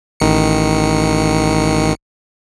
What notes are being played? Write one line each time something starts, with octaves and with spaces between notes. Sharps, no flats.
A1 D#3 C#7